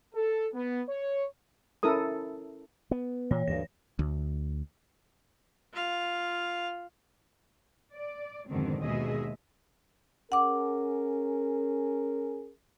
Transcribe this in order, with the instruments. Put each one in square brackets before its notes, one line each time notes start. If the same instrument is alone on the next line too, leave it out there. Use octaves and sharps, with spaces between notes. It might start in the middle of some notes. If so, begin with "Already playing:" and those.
[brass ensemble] A4
B3
C#5
[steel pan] C#4 E4 A4 A#4 D#6
[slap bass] B3
[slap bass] A#2 [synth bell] E3 C#5
[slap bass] D2 G2 [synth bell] A#6
[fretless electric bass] D2
[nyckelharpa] F4 F5
[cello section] D5
F2 G#2 B2 D3 D#3 C4
D#2 B2 G#3 G#4 D#5 E5
[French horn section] C#4 G#4 A#4 [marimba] F#5 D6